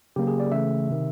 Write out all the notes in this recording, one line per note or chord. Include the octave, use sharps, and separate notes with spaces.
C#3 F#3 A#3 G4
G#4
D5
C#3 E3 A3 E5
C3 D#3